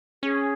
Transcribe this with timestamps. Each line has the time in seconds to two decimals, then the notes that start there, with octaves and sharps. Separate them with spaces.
0.23 C#4 G#4